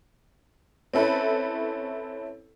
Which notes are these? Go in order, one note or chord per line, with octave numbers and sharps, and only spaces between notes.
C4 C#4 E4 A4 B4